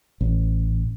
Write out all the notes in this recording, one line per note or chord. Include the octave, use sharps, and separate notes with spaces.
A1